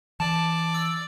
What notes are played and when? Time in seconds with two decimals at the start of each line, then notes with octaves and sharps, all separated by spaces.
0.20 E3 D5 A5
0.74 E6